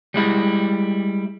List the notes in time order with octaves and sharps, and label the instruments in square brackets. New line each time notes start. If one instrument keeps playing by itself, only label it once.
[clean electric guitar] G3 G#3 E4